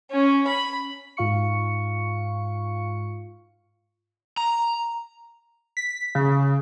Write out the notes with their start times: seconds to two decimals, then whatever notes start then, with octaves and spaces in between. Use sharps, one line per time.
0.11 C#4
0.47 B5
1.17 G#2 F4 F5 C#6 C#7
4.37 A#5
5.77 B6
6.15 C#3